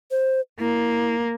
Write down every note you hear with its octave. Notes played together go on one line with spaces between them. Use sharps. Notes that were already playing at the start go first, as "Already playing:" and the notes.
C5
A#3 E4